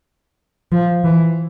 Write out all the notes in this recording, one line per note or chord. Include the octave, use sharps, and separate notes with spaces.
F3
E3